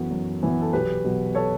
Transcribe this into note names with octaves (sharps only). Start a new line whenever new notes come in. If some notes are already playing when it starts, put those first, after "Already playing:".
Already playing: F#2 E3 B3 F#4 A4
F#2
E3 B3
A4
B1 G4 B4
B2 F#3
A4 C#5